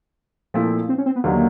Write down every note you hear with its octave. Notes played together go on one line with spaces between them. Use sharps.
A#2 F3 A3 C4 E4
C4
C#4
C4
B3
D#2 D3 F#3 A#3